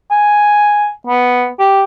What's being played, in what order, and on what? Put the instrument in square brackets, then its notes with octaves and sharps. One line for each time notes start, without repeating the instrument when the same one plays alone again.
[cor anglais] G#5
B3
G4